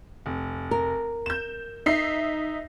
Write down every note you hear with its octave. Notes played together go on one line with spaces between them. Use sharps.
F1
A#4
G6 E7
D#4 E5 C7